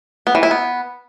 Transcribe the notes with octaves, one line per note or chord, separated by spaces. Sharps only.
B3
E3
E4
B3